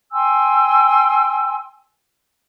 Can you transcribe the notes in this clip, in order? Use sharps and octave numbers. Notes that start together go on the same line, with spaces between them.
G5 G#5 C6 E6